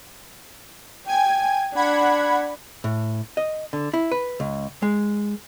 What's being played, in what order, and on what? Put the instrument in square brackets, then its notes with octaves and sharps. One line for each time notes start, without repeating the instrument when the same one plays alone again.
[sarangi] G5 [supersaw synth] G#5 G#6
[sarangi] D4 [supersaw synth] F#5 B5 G#6
[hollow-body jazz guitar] A2
D#5
D3
E4
B4
C#2
G#3